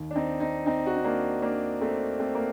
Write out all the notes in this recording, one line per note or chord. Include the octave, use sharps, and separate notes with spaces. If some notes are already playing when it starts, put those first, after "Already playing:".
Already playing: D#2 D#3
D4
C4 D#4
C4 D#4
C4 D#4
F#4
D#4
A#3 D4
A#3 D4
A3 C4
A3 C4
A#3